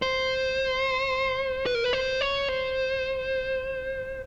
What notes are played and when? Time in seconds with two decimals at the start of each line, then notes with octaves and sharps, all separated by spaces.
0.02 C5
1.66 B4
1.75 A#4
1.84 B4
1.93 C5
2.21 C#5
2.49 C5